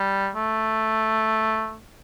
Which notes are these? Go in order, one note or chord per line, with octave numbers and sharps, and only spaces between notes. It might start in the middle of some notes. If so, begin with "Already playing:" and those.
Already playing: G3
A3